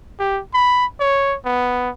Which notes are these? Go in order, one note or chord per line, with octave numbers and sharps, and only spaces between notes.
G4
B5
C#5
B3